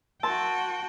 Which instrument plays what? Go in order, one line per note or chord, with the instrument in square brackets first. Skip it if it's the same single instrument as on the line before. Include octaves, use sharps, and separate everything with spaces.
[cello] F#4 G5 [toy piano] A#4 C6 [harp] A5